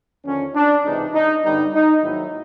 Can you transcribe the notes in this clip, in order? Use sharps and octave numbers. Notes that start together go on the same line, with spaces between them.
D#2 D3 F3 C#4
D4
C#2 C3 E3 G#3 D#4
D#4
G2 D3 G3 B3 D#4
D#4
G#2 D#3 F#3 A#3 E4